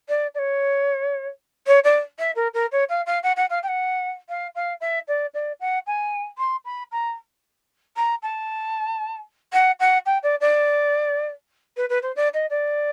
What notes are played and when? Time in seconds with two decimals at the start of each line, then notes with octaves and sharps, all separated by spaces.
0.09 D5
0.35 D5
0.39 C#5
1.67 C#5
1.84 D5
2.19 E5
2.36 A#4
2.54 A#4
2.72 C#5
2.89 F5
3.06 F5
3.23 F#5
3.37 F#5
3.50 F5
3.63 G5
3.68 F#5
4.29 F5
4.55 F5
4.81 E5
5.08 D5
5.34 D5
5.60 F#5
5.87 G#5
6.38 C6
6.65 B5
6.92 A#5
7.96 A#5
8.23 A5
9.53 F#5
9.80 F#5
10.06 G5
10.23 D5
10.41 D5
11.77 B4
11.89 B4
12.02 C5
12.16 D5
12.34 D#5
12.50 D5